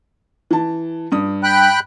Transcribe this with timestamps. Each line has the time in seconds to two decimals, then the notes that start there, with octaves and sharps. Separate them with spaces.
0.51 E3 A5
1.12 G2 D#6
1.43 G5 B5 F#6